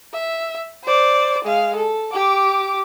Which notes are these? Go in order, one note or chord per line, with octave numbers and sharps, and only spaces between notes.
E5
C5 D5
G#3 F5
A4
G4 D6